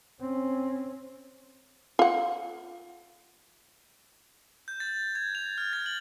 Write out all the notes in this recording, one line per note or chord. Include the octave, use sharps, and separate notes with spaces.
C4 C#4
F4 F#5
G6
A6
G#6
F7
F6
A6
F#7